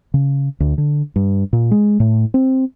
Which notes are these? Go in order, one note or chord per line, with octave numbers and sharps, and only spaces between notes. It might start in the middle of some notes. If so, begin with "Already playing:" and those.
C#3
D2
D3
G2
A#2
G#3
A2
C4